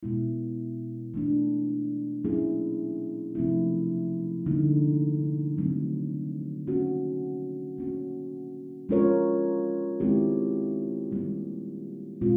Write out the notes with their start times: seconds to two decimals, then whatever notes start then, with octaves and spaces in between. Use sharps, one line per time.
0.03 B2 G#3 B3 E4
1.14 E3 A3 D4
2.24 F#3 A#3 C#4 E4 G#4
3.35 C3 F3 A3 C4 E4
4.46 D3 G3 A#3 D#4
5.57 D#3 F#3 A3 C4
6.67 A#3 C#4 F#4
7.78 A#3 C#4 F#4
8.89 G#3 C#4 F4 A#4 C#5
10.00 D#3 G#3 C4 E4 G4
11.11 D#3 G3 A#3
12.21 B2 G#3 C4 F4